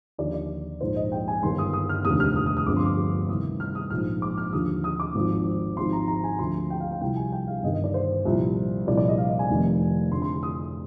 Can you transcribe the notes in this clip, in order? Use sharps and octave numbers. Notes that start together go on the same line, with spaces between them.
D#2 D3 F3 D5
D5
A#1 G#2 F3 C5
D#5
G5
G#5
G1 G2 D#3 C6
D#6
D#6
F6
F1 D#2 D3 F3 D#6
F6
D#6
D#6
D#6
G1 F2 D3 F3 D6
C6
D6
C2 C3 D#3 D#6
F6
D#6
A#1 G#2 F3 F6
D6
F6
D#2 D3 F3 D#6
D#6
D6
G#1 G#2 F3
G#1 G#2 F3 C6
A#5
A#5
G#5
D2 D3 F3 C6
G5
F5
G5
C2 C3 F3 G5
G#5
G5
F5
G1 G2 D#3 D#5
D#5
D5
C5
C2 A#2 F3
C2 A#2 F3 D5
D5
D#5
F5
D#5
G#5
F1 F2 D#3
F1 F2 D3 F3 C6
C6
C6
D#6